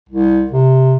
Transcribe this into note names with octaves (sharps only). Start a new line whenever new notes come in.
C2
C3